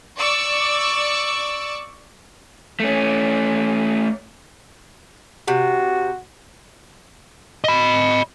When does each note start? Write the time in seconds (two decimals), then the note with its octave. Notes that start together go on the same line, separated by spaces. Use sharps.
0.18 D5 C#6 D6 E6
2.80 A3 C#4
5.48 C3 F#4
7.64 D#5 B5